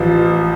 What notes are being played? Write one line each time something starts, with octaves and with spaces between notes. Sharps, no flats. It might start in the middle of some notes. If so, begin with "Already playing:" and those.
Already playing: A1 F3